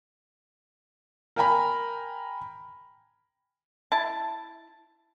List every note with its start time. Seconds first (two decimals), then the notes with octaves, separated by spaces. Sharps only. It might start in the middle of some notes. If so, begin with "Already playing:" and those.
1.36 A#4 G5 G#5 A#5 B5
3.92 E4 A5